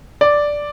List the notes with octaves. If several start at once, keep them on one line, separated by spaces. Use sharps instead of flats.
D5